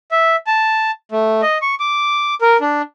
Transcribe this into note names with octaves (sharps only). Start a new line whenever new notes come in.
E5
A5
A3
D#5
C#6
D6
A#4
D4